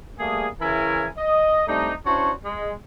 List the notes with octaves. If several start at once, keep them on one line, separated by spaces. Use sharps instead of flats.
G3 A3 A#3 G#4
C#3 E3 C#4 E4 A#4 G#5
D#5
G3 A3 C4 D4 D#4
C#4 D4 E4 F#4 C5 C#5
G#3